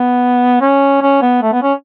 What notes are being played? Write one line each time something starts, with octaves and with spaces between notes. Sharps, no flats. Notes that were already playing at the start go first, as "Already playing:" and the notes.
Already playing: B3
C#4
C#4
B3
A3
B3
C#4